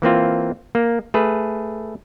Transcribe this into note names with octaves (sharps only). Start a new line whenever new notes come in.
E3 A#3 C4 F4
A#3
A3 G#4 B4